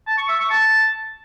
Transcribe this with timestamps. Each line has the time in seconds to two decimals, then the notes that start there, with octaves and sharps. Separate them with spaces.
0.07 A5
0.18 C#6
0.28 E5
0.39 C#6
0.50 A5